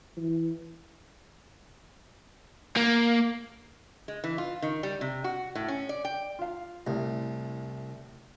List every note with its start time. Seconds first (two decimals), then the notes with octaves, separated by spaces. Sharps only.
0.17 E3
2.76 A#3
4.08 G#3
4.24 E3
4.38 F4
4.62 D#3
4.83 G3
5.01 C3
5.24 F#4
5.55 A2
5.68 C#4
5.89 D5
6.05 G5
6.39 F4 F5
6.87 C2 A2